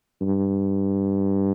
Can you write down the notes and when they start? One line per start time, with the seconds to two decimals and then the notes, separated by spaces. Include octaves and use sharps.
0.21 G2